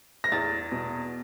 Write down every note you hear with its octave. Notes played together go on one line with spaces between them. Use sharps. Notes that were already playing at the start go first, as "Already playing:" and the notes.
A#6
E2 A6
B2